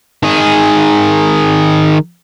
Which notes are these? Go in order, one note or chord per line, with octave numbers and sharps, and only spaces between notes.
D#3 G#4